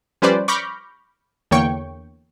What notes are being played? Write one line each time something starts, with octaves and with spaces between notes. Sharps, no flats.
F3 G3 C#4 B4 C5 D5
B5 C#6 D6 F6 G6 A#6
E2 D3 A#3 C#5 G5 C#6